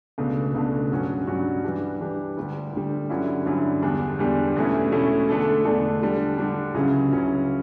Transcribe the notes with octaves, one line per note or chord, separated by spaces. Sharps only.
C#2 B2 A3 D4
C#2 B2 A3 D4
G2 F#3 C#4 F#4
G2 F#3 C#4 F#4
E3 G3 D4 G4
E3 G3 D4 G4
D2 D3 G3
D2 D3 G3
G2 D3 F#3 C#4 E4
G2 D3 F#3 C#4 E4
E2 D3 G3 D4
E2 D3 G3 D4
E2 B2 A3 C#4 E4
E2 B2 A3 C#4 E4
E2 D3 A3 D4 A4
E2 D3 A3 D4 A4
D3 G3 D4
D3 G3 D4
C#2 C#3 F#3 C#4 E4
C#2 C#3 F#3 C#4 E4